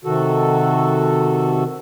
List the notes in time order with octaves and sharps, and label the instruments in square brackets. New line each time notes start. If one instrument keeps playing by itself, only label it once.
[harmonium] C3 D#3 F#4 A4